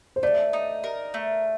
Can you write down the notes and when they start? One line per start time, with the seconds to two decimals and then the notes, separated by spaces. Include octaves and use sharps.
0.16 C5
0.23 A3 D5
0.53 D#4
0.84 A#4
1.14 A3